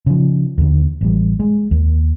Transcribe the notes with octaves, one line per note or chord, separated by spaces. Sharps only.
C#3 F3
D#2 D3
A1 G3
G#3
D#2